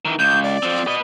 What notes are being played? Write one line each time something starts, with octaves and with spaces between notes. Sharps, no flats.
D#3 E3
C#2 G6
D5
F3 C4
B4 D#5